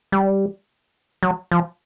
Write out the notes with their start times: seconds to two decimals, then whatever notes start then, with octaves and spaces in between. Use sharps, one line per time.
0.12 G3
1.23 F#3
1.51 F3